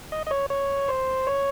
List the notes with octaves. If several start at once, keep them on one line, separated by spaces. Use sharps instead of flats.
D#5
D#5
C#5
C#5
C5
C#5